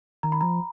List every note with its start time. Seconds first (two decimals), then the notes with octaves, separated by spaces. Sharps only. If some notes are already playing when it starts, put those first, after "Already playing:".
0.23 D#3 A#5
0.32 B5
0.41 F3 A#5